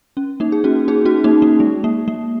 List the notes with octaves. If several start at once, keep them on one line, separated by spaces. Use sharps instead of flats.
C#4
A#3 D#4
G#4
C#4 F#4
D#4 G#4
C#4 F#4
A#3 D#4
A#3
G#3
A#3
A#3